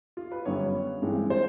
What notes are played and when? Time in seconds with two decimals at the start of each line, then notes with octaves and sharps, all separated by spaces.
0.17 F4
0.32 B4
0.45 G1 F#2 D3 G3 B3 C#5
1.02 G2 E3 G#3 C4
1.30 C5